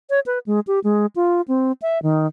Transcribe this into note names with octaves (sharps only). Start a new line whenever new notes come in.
C#5
B4
G#3
G4
G#3
F4
C4
E5
D#3